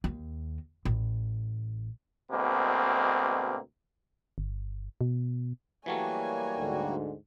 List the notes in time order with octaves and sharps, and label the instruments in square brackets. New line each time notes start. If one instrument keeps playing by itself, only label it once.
[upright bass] D#2
A1
[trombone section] D2 B2 G#3 A#3 C4
[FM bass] G1
B2
[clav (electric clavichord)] E3 F#3 A3 [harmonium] G3 A#3 F#4 [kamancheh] C#5 G#5
[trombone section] D2 G#2 D3